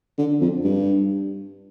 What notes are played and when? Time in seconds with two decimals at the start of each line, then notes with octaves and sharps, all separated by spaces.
0.18 D3
0.41 F2
0.64 G2